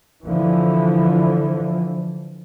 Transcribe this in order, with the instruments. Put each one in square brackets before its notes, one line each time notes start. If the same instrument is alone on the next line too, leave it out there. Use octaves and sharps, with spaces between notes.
[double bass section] D3 E3 F3